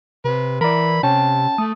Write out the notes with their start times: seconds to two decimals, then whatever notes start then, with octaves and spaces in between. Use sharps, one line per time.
0.25 C3 B4
0.61 E3 A#4 D5 B5
1.03 C3 C#4 G5 A5
1.58 A3 D#6